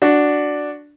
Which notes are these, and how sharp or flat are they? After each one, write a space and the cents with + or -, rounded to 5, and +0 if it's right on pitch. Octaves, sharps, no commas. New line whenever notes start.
D4 +0 F#4 +0